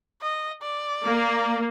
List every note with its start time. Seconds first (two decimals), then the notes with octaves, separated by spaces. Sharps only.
0.22 D#5
0.62 D5
1.04 A#3